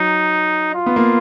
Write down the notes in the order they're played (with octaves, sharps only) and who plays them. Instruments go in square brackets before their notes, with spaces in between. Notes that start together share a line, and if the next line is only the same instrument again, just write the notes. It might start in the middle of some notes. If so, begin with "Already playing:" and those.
Already playing: [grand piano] F#3 [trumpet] D#4
[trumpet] F4
[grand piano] B3
A#3